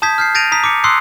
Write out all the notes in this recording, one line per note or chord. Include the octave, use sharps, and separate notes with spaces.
A5 D#6 G6 G#6 B6
F6 G6 C7
G6 A6 A#6 D7 D#7 F7
A#5 D#6 B6
D6 C#7
C6 D#6 E6 F#6 C7